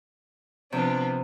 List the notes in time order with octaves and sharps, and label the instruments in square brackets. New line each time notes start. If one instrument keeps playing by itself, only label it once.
[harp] C3 [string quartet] F3 B3 D4